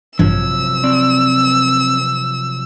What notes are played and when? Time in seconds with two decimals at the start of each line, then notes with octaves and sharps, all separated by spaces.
0.19 A1 G2 C3 F3 F#3 E6 G#6
0.84 C4 D5